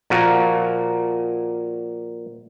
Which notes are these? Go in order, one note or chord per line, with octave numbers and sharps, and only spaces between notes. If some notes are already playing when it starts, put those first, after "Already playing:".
A#2 F3 A#3 F#4 A#4